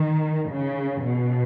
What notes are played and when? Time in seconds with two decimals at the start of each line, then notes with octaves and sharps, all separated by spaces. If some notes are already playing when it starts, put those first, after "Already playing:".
Already playing: D#3
0.49 C#3
1.04 B2